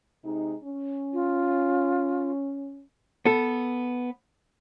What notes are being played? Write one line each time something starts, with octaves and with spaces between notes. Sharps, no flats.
C3 G#3 D#4
C#4
F4
B3 A4